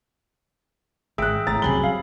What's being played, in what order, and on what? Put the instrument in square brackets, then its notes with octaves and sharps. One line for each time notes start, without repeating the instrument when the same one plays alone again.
[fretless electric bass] G#1 [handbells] G#4 E5 G5 [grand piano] E6 F#6
[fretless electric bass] G#1 [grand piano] A2 A#5 A6
[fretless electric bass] F1 C2 C3 [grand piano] F#2 G#4 G7 [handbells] B5
[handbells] F5